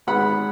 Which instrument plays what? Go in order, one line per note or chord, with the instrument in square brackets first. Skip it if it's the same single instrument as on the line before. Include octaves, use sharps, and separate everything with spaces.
[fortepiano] G#1 G#2 G#3 B3 F#5 B5